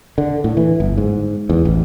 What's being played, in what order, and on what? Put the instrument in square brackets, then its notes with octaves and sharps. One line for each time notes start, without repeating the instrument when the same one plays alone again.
[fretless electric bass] D3
A2
E3
G1
G#2
E2
A1